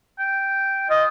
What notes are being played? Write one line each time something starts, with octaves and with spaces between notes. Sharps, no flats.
G5
F4 D#5